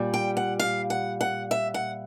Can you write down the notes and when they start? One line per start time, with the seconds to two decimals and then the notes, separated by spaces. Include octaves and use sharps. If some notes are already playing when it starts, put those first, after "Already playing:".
Already playing: A#2 G3
0.14 G5
0.37 F#5
0.59 F5
0.90 F#5
1.21 F#5
1.51 E5
1.74 F#5